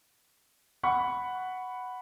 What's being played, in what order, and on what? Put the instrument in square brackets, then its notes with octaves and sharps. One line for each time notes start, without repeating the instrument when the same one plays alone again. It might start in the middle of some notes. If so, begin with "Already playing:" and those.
[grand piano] F#5 B5 C#6